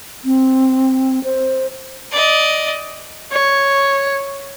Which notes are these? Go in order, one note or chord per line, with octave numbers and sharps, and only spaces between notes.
C4
C5
D5 D#5
C#5